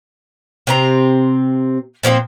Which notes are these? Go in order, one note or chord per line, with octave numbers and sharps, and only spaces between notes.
C3 C4 A#5
A#2 F3 A3 C4